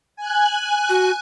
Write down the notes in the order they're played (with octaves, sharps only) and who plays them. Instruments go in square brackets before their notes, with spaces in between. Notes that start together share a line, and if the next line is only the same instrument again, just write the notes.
[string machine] G#5 F#6
[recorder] F#4